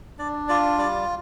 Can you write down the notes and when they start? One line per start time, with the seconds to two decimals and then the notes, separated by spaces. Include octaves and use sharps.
0.18 D4 D5
0.48 F4 D5
0.78 G3 D5